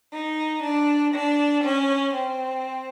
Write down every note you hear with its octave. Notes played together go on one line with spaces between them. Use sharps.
D#4
D4
D4
C#4
C4